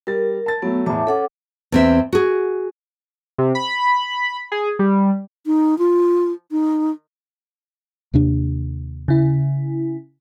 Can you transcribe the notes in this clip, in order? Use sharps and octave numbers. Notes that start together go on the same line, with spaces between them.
G3 A#4 A6
A5 A6
F#3 A3 B3
E2 A2 E5 A5 D6
C#4 A4 F#5 D6
E2 C4 E5
F#4 G#4
C3
B5
G#4
G3
D#4
F4
D#4
D#2 C3 D4
C#3 E4